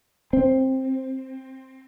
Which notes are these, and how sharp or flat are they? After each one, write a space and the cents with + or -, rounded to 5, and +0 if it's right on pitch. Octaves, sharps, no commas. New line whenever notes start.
C4 +10